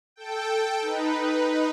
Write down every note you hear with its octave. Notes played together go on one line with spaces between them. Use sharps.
A4 G5
D#4 B4